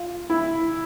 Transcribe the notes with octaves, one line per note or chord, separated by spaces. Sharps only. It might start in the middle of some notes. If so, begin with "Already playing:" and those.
Already playing: F4
E4